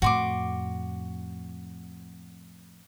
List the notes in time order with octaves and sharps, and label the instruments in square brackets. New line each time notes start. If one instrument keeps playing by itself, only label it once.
[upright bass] F2 A2 [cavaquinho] F#4 C6 D6